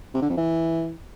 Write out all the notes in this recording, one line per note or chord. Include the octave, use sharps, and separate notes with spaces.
C3
D3
F2
E3